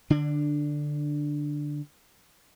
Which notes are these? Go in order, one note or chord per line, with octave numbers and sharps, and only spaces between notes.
D3 D4